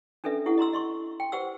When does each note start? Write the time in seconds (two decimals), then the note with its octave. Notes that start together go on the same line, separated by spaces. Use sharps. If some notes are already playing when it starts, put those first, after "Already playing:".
0.24 C#4 D4 A4 B4 E5
0.46 E4 G4 A4 F#5
0.58 D#5 A#5 C6 E6
0.73 D#5 C6 C#6
1.20 G5
1.32 G4 B4 C5 F#5 G5 E6